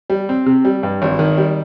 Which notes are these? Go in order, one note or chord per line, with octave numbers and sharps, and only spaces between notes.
G3
C4
C3
G3
G2
G#1
D#3
G3